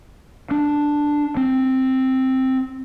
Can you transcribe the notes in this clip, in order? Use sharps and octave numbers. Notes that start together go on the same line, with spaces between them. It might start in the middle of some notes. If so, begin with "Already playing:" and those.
D4
C4